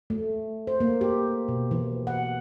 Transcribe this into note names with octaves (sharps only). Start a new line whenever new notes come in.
A3
C5
A#3
G4
B2
E3
F#5